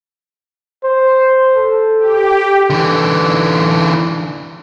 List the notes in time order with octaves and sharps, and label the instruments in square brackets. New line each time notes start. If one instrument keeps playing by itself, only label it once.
[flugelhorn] C5
A4
[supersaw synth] G4
[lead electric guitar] D3 E3